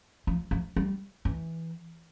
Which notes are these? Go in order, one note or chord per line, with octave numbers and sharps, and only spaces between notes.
F3
F3
G3
E3